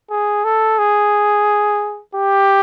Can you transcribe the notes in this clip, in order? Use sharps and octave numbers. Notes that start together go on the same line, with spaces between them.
G#4
A4
G#4
G4